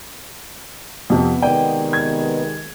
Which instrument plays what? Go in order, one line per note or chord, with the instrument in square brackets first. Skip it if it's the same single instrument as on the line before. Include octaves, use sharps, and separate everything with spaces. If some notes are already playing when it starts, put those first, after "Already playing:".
[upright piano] F2 C3 [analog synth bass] B3
[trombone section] C3 D#3 G#3 [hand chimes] D5 [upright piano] G5
[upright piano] G#6